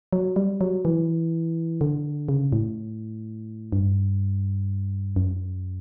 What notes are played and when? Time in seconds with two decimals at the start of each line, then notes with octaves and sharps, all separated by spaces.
0.13 F#3
0.36 G3
0.61 F#3
0.85 E3
1.81 D3
2.29 C#3
2.53 A2
3.73 G2
5.16 F#2